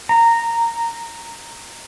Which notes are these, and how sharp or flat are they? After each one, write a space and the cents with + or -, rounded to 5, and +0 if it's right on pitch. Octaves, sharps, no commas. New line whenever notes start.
A#5 -10